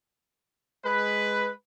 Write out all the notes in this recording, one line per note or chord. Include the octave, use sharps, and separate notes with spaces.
G#3 B4